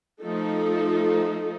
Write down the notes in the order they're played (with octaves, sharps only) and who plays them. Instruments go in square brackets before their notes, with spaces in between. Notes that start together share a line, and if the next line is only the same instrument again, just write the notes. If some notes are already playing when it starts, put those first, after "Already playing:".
[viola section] F3 A3 D#4 A4